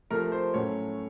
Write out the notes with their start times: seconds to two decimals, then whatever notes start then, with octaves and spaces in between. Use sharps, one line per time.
0.11 C3 F3 A3 A#4
0.32 C5
0.54 A2 F#3 A3 C#4 C#5